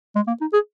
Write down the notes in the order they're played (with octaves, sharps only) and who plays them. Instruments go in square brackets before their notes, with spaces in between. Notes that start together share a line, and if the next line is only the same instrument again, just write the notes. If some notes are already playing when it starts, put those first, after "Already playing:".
[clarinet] G#3
A#3
D#4
G#4